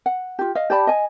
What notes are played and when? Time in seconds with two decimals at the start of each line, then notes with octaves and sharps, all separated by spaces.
0.06 F#5
0.39 F4 G4
0.55 D#5 F5
0.70 G4 D5 A5 B5
0.87 D#5 G#5